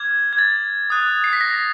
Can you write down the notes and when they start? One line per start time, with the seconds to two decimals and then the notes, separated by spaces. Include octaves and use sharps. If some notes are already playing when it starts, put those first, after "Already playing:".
Already playing: D6 F6 G#6
0.33 G#6
0.38 A6
0.90 D#6 F#6
1.24 C7
1.33 B6
1.41 A#6